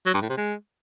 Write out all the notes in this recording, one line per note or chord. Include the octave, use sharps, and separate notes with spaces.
F#3
G2
A2
C3
G#3